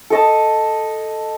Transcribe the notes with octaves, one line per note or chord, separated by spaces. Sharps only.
A4 D#5 A5